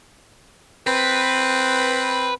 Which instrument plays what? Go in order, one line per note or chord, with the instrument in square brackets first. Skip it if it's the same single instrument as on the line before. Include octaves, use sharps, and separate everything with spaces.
[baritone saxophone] C4 [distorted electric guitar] B4